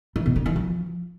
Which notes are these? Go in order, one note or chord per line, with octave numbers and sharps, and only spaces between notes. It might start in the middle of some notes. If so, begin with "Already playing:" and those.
E3
B2
D3
E3
F3